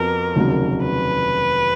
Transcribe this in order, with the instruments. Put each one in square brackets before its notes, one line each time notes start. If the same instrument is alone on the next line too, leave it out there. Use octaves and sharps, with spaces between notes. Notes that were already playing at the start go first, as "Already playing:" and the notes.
Already playing: [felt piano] F2 F3 B3 F#4 [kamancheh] A#4
[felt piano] F1 D#2 C#3 F#3
[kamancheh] B4